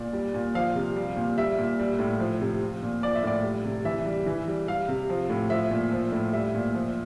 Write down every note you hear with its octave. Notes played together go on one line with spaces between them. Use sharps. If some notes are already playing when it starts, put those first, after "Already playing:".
Already playing: A#2 D5
G3
A#2
F3 F5
C3
G3
A#2
G3 E5
A#2
G3
A2
F3
C3
F3
A#2
F3 D5
E5
A2 D5
G3
C3
E3 E5
G3
E3
G3
G3 F5
C3
F3
A2
F3 E5
A#2
F3
A2
G3 E5
A#2
F3